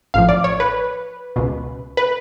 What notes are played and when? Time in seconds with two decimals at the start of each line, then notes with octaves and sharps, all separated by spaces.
0.14 A1 A2 F3 F5
0.29 D5
0.44 C#5
0.60 B4
1.36 C#2 B2
1.97 B4